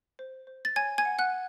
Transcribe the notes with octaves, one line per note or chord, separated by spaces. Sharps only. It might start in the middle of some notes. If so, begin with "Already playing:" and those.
C5
C5
A6
C#5 G#5 G#6
G#5 G#6
F#5
F#5 F#6